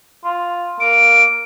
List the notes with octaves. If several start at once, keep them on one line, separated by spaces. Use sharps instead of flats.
F4
A#3 D7